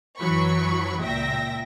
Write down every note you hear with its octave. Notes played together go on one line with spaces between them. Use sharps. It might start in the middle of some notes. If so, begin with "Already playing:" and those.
F#2 E3 F#3 B5 C#6
C#2 A#2 E5 G5 A#6